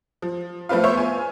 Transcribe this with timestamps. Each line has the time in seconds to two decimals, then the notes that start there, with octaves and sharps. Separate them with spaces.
0.22 F3
0.69 F3 A3 C4 B4 F5
0.84 B3 C5 C#5 E5
0.97 G#5